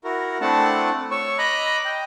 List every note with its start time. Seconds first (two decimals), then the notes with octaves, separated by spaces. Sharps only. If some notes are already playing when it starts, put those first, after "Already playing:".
0.04 E4 F#4 A#4
0.41 A3 C4 D4 E4 F#5 A5
1.11 C#5 C#6 E6
1.39 D#5 A#5 B5 D6 F#6
1.85 D#5 G5